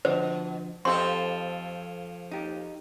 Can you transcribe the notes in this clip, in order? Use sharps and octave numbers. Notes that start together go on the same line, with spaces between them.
B2 D3 F3 C5
F2 F3 C4 G4 A4 C6
D#4 G4